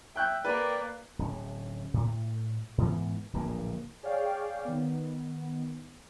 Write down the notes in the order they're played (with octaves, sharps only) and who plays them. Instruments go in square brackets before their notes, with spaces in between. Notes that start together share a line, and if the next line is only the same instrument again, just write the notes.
[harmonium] E5 [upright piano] G5 F#6 G6
[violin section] A#3 [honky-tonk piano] B4 [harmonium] D5
[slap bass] D1 C#4
A2
G#2 E3 B3
D1 A#1 G2 A#3
[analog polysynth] G#4 C#5 D5 F5 G5
D#3 B3